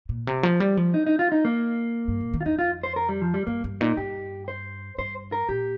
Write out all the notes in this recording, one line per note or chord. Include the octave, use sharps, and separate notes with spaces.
A#2
C3
F3
G3
F3
D#4
D#4
F4
D#4
A#3
G2
A#2
D#3
F4
F2 D#4
F4
C5
A#4
G3
F3
G3
G2 A#3
G2
A#2 D#4
G2 G4
C5
G2 C5
A#4
A#2 G4